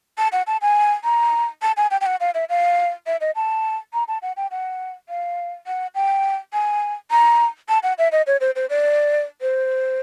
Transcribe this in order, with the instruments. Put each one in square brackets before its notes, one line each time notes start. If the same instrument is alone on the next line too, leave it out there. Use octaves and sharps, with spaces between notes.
[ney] A5
F#5
A5
G#5
A#5
A5
G#5
G5
G5
F#5
F5
E5
F5
E5
D#5
A5
A#5
A5
F#5
G5
F#5
F5
F#5
G5
G#5
A#5
A5
F#5
E5
D#5
C#5
C5
C5
D5
C5